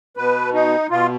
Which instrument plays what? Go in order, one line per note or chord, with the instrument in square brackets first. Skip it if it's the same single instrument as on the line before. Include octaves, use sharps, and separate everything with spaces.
[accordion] B2 B4
D#4
B2 F4